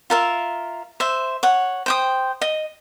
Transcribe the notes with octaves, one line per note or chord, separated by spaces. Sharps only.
F4 A#4 E5
C5 E5
C#5 F#5
C5 G5 D#6
D#5